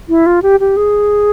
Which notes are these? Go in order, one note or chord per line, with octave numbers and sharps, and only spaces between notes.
E4
F4
G4
G4
G#4